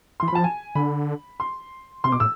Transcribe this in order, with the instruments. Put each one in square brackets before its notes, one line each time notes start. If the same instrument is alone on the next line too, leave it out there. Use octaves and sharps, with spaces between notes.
[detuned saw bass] E3 [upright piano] C6
[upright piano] B5
[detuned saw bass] F3 [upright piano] A5
[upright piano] G#5
[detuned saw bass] D3 [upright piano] B5
[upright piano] C6
[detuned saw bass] C3 [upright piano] C6
[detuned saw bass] B2 [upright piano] D6
[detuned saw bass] A2 [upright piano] E6